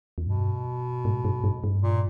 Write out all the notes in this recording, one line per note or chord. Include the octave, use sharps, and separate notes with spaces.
E2
G2 B2
G#2
G2
G2
G2
A#2